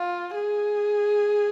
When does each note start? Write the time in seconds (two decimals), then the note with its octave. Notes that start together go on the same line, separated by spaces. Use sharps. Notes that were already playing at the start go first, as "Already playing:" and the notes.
Already playing: F4
0.36 G#4